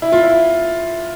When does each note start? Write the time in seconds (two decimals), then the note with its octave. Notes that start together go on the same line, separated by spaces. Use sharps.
0.02 E4
0.12 F4
0.23 E4